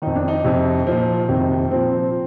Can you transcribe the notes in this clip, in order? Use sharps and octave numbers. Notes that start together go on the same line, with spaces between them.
F2 D#3 D#4
D4
D#4
F2 C3 F3
A#2 F3
F2 C3 D#3
A#2 F3 C4